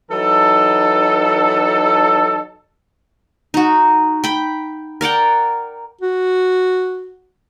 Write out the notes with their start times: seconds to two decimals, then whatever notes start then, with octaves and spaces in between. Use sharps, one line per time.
0.11 E3 F#3 D#4 A4
3.54 D#4 F#4
4.24 G5 B5
5.01 A#4 D5 F#5 G5
6.01 F#4